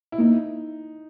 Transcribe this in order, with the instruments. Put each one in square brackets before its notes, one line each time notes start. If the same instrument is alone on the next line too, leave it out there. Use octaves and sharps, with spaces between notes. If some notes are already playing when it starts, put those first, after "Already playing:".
[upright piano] E4
[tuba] A#3 [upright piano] D#4